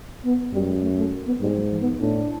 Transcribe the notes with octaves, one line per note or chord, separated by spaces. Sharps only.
B3
F#2 G3
G#3
A3
A3
B3
G#2 G3
F#3
F3
B3
A2 D4